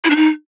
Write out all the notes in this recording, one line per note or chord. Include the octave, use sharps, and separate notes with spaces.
E4
D4
D#4